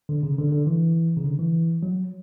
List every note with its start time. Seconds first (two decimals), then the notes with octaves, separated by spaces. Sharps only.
0.09 D3
0.23 C#3
0.38 D3
0.52 D3
0.67 E3
1.17 C#3
1.24 D3
1.39 E3
1.83 F#3